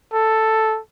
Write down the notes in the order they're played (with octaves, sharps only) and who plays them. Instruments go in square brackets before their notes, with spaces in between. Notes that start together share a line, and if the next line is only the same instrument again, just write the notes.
[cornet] A4